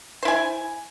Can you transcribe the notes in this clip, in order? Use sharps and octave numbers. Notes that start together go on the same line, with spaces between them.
E4 C5 G#5